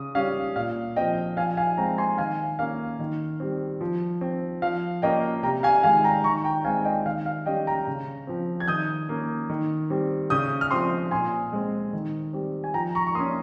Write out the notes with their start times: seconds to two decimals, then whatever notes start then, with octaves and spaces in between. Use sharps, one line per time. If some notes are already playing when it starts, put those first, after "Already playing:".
Already playing: C#3 D#6
0.15 G3 C#4 F5
0.56 A#2 F5
0.96 F3 C4 D#5 G5
1.37 F3 F5 G#5
1.57 F5 G#5
1.77 G#3 C4 G5 A#5
1.98 G#5 C6
2.18 D#3 F5 G#5
2.59 A#3 C#4 F5
2.99 D#3
3.40 G3 C4
3.81 F3
4.21 C4
4.62 F3 F5
5.02 A#3 C#4 D#5 G5
5.43 C3 G5 A#5
5.63 F5 G#5
5.83 D#3 G#3 F5 G#5
6.04 G5 A#5
6.24 D#3 A#5 C#6
6.44 G5 A#5
6.64 G#3 C4 F5 G#5
6.85 D#5 G5
7.06 D#3 F5
7.26 F5
7.46 G3 C#4 D#5 G5
7.67 G5 A#5
7.87 C#3
8.27 F3 C4
8.60 G#6
8.68 D#3 D#6 G6
9.09 A#3 C#4
9.50 D#3
9.90 G3 C4
10.30 C#3 D#6 G6
10.61 F6
10.71 F3 C4 C6 D#6
11.11 A#2 G#5 C6
11.52 G#3 C4
11.93 D#3
12.33 G3 C4
12.64 G#5
12.74 F3 G5 A#5
12.95 A#5 C#6
13.07 C#6
13.15 A#3 C6 D#6
13.19 C#4